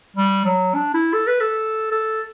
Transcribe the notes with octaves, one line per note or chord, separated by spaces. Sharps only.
G3
F#3
D4
E4
A4
B4
A4
A4